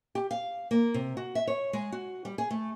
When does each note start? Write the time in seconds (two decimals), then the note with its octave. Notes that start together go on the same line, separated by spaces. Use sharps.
0.15 G4
0.31 F5
0.71 A#3
0.94 C3
1.17 F#4
1.35 E5
1.47 C#5
1.73 G#3
1.92 F#4
2.25 G3
2.38 G#4
2.51 A3